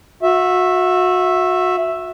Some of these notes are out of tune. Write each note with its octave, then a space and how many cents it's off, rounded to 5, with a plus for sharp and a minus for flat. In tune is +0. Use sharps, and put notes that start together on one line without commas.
F#4 -30 E5 +0